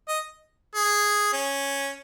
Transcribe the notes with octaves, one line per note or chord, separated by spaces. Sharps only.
D#5
G#4
C#4